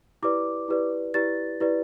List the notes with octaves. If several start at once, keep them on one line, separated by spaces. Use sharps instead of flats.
E4 G4 B4 D5 D6
E4 G4 B4 D5
E4 G4 B4 D5 A6
E4 G4 B4 D5